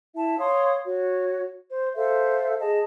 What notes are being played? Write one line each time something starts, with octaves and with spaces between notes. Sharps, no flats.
E4 E5 A5
C#5 F5 C6 D#6
F#4 C#5
C5
A4 C5 E5 F5
G#4 D#5 A5